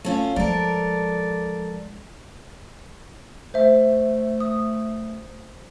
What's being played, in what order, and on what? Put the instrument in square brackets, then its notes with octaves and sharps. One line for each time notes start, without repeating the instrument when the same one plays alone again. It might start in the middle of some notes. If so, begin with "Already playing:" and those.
[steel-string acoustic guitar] A3 C#4 F4
[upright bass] F3 G#3 [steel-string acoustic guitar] A4 A#4 [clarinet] D5
[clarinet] A3 [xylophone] C5 E5
[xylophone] D#6